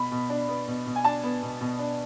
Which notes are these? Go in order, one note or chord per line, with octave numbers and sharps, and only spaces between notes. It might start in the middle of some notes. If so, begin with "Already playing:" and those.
Already playing: B2 B5
B2
D4
B3
B2
B2
G#5
D4 A5
B3
B2
B2
D4